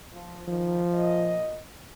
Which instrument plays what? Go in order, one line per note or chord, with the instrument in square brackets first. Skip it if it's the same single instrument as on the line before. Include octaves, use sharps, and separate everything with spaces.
[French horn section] F3
[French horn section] D#3 [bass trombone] F3
[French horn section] A#2 D#5